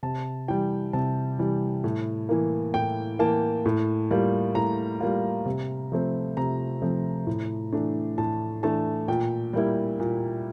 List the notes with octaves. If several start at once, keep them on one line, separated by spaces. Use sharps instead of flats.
C3 A5
E3 G3 G5
C3 A5
E3 G3
A2
E3 A#3
A2 G5
E3 A#3 A5
A2
G3 A#3 F4
A2 A#5
G3 A#3 F4
C3
F3 A3 C4
C3 A#5
F3 A3 C4
A2
E3 A3 D4
A2 A5
E3 A3 D4 A5
A#2 G5
G3 A#3 E4
A#2